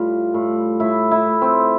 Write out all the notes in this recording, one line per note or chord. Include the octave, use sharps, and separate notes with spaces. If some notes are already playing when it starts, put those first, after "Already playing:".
Already playing: A2 G3 F4
A2
A2 E4
E4
A2
C4